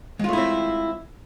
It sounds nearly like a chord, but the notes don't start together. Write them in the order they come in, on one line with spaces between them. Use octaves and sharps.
G#3 F4 A3 E4 C4